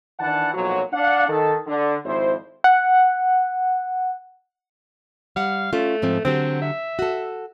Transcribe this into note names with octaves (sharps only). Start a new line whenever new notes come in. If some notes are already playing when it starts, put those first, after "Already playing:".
D#3 E3 D4 F#5 A5
B1 A#2 F3 F#3
D4 F5 F#5
D#3 A4 A5
D3
G#1 F2 E4 C5
F#5
G3 F5 F#5
A3 C#4 F4
G#2 F3 C4
D3 F#3 C4 G4
E5
F#4 A4